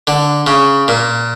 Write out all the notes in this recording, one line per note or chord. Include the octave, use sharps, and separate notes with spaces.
D3
C#3
A#2